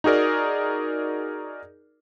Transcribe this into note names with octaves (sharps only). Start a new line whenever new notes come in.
D#4 F#4 G#4 A#4 D5